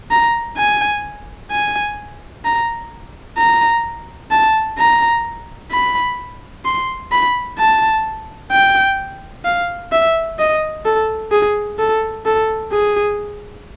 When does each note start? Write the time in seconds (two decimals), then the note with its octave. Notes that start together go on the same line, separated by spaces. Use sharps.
0.11 A#5
0.57 G#5
1.51 G#5
2.45 A#5
3.38 A#5
4.31 A5
4.78 A#5
5.71 B5
6.65 C6
7.12 B5
7.58 A5
8.52 G5
9.45 F5
9.92 E5
10.39 D#5
10.85 A4
11.31 G#4
11.79 A4
12.26 A4
12.72 G#4